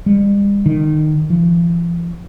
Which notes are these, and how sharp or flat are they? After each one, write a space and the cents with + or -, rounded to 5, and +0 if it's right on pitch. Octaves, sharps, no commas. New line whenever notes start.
G3 +45
D#3 -20
F3 -40